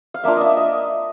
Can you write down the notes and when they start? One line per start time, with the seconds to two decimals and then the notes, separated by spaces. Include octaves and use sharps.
0.14 F5
0.24 A#3 D4 F4 E5
0.36 D#5 E5
0.57 D#5